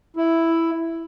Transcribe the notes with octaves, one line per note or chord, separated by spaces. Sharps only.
E4